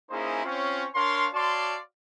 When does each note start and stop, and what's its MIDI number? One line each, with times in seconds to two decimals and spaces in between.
0.10 0.41 58
0.10 0.41 61
0.10 0.41 63
0.10 0.41 64
0.10 0.41 68
0.10 0.41 72
0.45 0.86 60
0.45 0.86 61
0.45 0.86 65
0.95 1.27 62
0.95 1.27 70
0.95 1.27 73
0.95 1.27 77
0.95 1.27 84
1.34 1.77 66
1.34 1.77 73
1.34 1.77 74
1.34 1.77 77
1.34 1.77 81
1.34 1.77 84